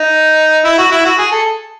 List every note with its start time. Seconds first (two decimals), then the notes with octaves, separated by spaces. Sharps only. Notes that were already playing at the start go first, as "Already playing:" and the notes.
Already playing: D#4
0.64 E4
0.78 F#4
0.91 E4
1.05 F#4
1.18 G#4
1.32 A4